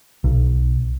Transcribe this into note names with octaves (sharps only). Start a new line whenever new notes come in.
B1